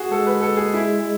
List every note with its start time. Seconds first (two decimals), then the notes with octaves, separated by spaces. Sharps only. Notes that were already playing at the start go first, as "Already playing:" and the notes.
Already playing: F#4 G#4
0.11 G#3 A4
0.26 B4
0.41 A4
0.57 G#4
0.74 E4